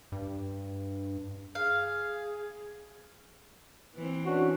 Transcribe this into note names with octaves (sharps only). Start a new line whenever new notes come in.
G2
G#4 F5
E3 C4
C#4 D4 F#4